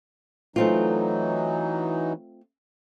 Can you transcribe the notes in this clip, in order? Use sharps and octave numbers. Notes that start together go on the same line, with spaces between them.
E3 F#3 A3 C4 D#4 F4